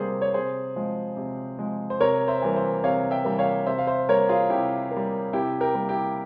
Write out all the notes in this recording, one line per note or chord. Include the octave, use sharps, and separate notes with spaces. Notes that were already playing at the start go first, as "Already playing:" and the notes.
Already playing: C3 G3 A#3 G#4 C5
C#5
C3 G#4 C5
F3 G#3
C3
F3 G#3
C5
C3 A#4 C#5
C5 E5
E3 G3 A#3
C5 E5
C3 C#5 F5
E5 G5
E3 G3 A#3
C#5 F5
C3 C5 E5
F5
C5 E5
G3 A#3 A#4 C#5
F4 G#4
C3 E4 G4
A#3
G3
C3 E4 G4
G4 A#4
G3 A#3
E4 G4